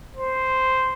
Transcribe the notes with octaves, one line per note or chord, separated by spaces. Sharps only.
C5